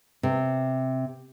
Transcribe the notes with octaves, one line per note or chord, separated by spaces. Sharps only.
C3